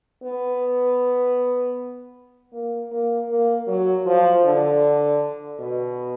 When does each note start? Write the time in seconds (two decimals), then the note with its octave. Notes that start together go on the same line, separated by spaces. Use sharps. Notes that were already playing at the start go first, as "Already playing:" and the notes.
0.23 B3
2.53 A#3
2.91 A#3
3.29 A#3
3.67 F#3
4.06 F3
4.44 D3
5.59 B2